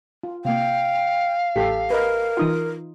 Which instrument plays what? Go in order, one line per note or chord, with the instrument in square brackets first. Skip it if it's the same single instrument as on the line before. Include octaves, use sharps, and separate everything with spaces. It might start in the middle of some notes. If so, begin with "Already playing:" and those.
[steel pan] F4
[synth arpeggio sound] C3 A#3 [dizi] F5 [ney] G5
[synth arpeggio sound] A1 B6 [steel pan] G4 A4
[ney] A#4 [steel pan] B4 D#5
[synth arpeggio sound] E3 D#4 F4 [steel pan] C6 D#6